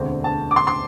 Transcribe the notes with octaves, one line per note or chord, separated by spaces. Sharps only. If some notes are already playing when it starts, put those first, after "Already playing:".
Already playing: E1 D2 D3 A3 C4
A5
D6
C6
C6